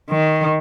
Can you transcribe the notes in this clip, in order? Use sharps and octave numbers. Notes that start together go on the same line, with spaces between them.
D#3